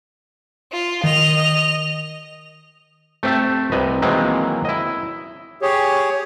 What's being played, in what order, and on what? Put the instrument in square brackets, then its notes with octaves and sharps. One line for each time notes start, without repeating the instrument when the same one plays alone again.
[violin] F4
[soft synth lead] D#3 [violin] D#5 F7
[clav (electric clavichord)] A3 C4 G4 E5 A5
C2 C3 B4 D#5
D#3 E3 F#3 G#3 A#3 C4
E4 D#5
[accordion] G4 G#4 C#5